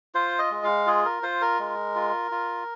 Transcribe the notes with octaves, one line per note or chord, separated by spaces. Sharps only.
F4 C5
D#5
G#3
F5
F4 G#4
A#4
F4 C5
A#4
G#3
F4
F4